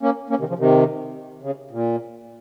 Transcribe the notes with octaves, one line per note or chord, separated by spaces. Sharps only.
A#3 C#4
A#3 C#4
C3 D#3
C#3 F3
C3 D#3
C#3
A#2